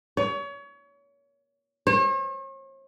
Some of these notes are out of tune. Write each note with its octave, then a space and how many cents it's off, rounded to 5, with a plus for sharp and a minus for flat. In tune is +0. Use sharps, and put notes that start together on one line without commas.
C#5 +30
C#5 -45